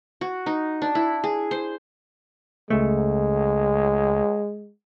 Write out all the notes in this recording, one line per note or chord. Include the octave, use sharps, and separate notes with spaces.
F#4
D#4
D4
E4
G#4
C5
C#2 G#3 A3